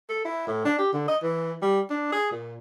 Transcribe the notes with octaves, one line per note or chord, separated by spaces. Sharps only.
A4
E4
A2
D4
G4
D3
D#5
E3
G3
D4
G#4
A#2